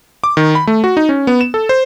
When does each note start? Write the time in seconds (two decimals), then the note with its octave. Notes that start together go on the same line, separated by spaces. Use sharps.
0.24 D6
0.37 D#3
0.55 B5
0.67 A3
0.84 F#4
0.97 D#4
1.09 C#4
1.27 B3
1.41 E7
1.54 A4
1.69 C5